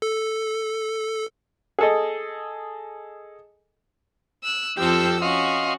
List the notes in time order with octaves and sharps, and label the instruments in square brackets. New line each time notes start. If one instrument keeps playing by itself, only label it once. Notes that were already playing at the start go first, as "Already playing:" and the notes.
[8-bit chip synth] A4
[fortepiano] G#4 A4 D#5
[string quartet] E6 F#6
[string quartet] F2 F3 C4 [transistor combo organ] G4 [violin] A4 E6
[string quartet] C#4 [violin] F#4 [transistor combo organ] D#5 F5 C6